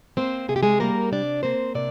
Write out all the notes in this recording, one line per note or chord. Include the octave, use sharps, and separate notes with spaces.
A#3 C4 C5
C3 G#4
G4
G#3 G#4
G3 A#3 A#4
C3 D4 D5
A#3 C4 C5
C3 D4 D5